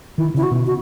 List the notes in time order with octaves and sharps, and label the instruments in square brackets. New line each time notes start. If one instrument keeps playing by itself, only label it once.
[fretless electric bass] D#3 [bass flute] E4
[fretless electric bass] C#3 [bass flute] E4
[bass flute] F#4
[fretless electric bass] B2
[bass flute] F#4